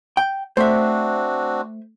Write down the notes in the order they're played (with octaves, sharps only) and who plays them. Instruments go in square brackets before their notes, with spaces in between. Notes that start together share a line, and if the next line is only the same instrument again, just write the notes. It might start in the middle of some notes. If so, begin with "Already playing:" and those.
[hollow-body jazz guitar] G5
[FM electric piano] A3 [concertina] C4 D4 F#4 [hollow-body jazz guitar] C5 E5